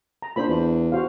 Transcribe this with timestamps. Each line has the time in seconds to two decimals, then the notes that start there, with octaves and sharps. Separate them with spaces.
0.22 A#5
0.36 A#2 D4 C5 B5
0.48 E2
0.92 F#4 C5 F5